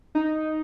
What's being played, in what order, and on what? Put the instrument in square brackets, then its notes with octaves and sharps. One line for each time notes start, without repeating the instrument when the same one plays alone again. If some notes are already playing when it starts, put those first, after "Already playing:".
[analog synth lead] D#4